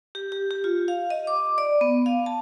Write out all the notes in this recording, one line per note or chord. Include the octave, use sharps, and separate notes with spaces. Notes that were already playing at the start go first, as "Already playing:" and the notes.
G4
G4
G4
F4
F5
D#5
D6
D5
B3
F5
A5